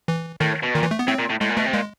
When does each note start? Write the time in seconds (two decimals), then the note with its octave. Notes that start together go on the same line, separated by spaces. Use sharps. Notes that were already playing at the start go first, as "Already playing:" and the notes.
0.08 E3
0.41 A2 D#3
0.63 B2
0.74 A#2 D#3
0.83 E3
0.91 A3
0.99 B3
1.07 A2 C4
1.19 A#2
1.30 A2
1.41 A2 G#3
1.49 A#2
1.57 B2 A3
1.66 C3
1.74 A#2 G#3